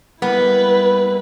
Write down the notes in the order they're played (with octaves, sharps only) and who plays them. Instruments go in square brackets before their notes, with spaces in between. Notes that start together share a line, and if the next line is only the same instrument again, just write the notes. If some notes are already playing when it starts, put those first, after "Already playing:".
[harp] G3 A#3 [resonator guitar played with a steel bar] B3 [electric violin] E4 B4